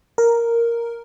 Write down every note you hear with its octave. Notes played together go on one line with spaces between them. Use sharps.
A#4